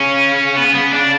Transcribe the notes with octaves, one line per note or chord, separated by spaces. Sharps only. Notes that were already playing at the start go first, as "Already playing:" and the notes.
Already playing: C#3 C#4
B3
B3
D4